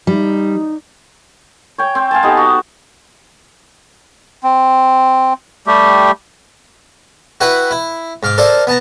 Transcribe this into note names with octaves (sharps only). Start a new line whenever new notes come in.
G3 D#4
C#5 G5
C4
F5 G#5 A5
B3 D#4 G4 A4
F#4
C4
G3 A3 G4
E4 F#4 B4 F#5 G5
E4
G#2 F5 D6
A4 A#4 C5 D5 F5
B3 A5 A#5